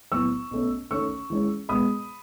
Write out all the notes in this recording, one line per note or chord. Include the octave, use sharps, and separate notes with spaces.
A2 F#3 B3 C#6 E6
B2 A3 C#4
D#3 A3 C#4 C#6 E6
E3 G#3 C#4
B2 G#3 B3 B5 D#6